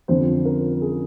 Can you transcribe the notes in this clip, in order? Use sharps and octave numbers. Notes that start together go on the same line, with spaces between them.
F2 D3 F3 C4 C5
A#4
G#4